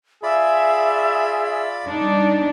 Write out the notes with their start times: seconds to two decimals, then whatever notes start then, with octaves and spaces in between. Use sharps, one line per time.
0.23 F4 G#4 D5 E5 B5
1.87 G3 D4 D#4